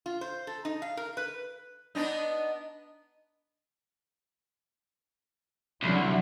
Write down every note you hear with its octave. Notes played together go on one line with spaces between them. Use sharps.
F4
C5
A4
D#4
F5
A#4
B4
B3 D4 D#4
C2 D3 F#3 E4